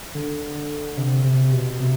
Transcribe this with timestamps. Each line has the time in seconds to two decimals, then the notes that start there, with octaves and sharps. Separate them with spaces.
0.15 D3
0.97 C3
1.24 C3
1.52 B2
1.80 C3